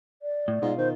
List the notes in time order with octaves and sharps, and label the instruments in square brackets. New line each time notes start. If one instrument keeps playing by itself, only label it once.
[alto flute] D5
[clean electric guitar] A2
[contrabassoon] G#2 [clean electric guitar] B2 F4
[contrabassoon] D#3 [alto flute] C5